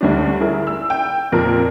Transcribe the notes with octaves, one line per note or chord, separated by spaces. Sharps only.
D2 G3 C#4 D4
E4 G#4 A#4
E6
G5
F2 A#2 A#4